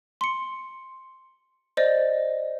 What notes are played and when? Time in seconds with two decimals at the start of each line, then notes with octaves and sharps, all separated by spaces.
0.21 C6 C#7
1.77 C5 D5 D#5